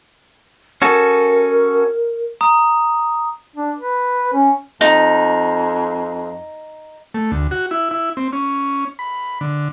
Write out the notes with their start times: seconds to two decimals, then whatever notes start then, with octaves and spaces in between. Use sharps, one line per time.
0.82 C#4 F#4 A4 A#4
2.41 A#5 D#6
3.56 D4
3.79 B4
4.34 C#4
4.81 F2 D#4
7.14 A3
7.32 D2
7.51 F#4
7.71 E4
7.91 E4
8.17 C4
8.33 C#4
8.99 B5
9.41 D3